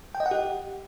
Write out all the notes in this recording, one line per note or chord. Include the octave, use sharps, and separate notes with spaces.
G5
D#5
F#5
G4